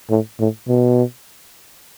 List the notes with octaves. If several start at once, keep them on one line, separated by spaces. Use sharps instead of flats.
A2
A2
B2